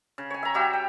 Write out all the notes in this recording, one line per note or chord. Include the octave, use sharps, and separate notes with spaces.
C#3
C#5 G#5
E5 A#5
G3 F#4 G4 E5
G5